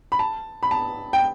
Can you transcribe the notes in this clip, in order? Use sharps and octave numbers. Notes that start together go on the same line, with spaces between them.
B5
A5
B5
A5
G5